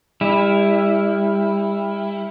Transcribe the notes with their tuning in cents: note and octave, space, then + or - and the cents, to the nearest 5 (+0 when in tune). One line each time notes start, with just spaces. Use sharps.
G3 +35 E4 +0